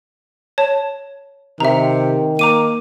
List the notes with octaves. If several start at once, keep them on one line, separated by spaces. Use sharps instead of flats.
C#5 A5
C3 D#3 E5 A#5
A#3 A#5 D6 D#7